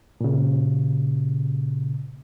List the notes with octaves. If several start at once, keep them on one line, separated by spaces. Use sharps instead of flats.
A#2 C#3